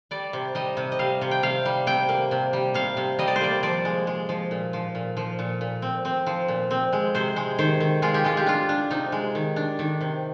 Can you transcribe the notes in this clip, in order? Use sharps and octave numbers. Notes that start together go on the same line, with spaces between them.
G3 D5
C3
G3 D#5
C3
D#5
G3 F5
C3
G5
C3 F5
G3
C3 G5
A#3
C3
G3
C3 F5
C3
G3 D#5
D5
C5
A#3 D5
F3 D5
G#3
G#3
F3
A#2
F3
A#2
F3
A#2
A#2
C4
C4
F3
A#2
C4
G#3
C3 C5
G#3
D#3 C5
D#3
G#3 F4
G4
G#3 F4
G4
D4 F4
D4
C3 D#4
G#3
D#3
D4
D#3
C3